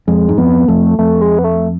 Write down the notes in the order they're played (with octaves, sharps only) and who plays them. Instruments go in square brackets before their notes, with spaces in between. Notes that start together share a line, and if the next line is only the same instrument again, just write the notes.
[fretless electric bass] F2 [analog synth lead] G#3
[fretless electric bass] G#2
[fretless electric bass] F2 [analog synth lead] B3
[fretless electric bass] F2 [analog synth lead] A3
[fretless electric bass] F2 [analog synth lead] A3
[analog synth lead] G#3
B3
A3